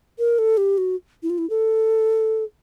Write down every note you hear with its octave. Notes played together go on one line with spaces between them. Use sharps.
A#4
A4
G4
F#4
E4
F4
E4
A4